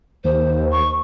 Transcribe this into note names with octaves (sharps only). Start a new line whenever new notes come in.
D#2 C5
C#6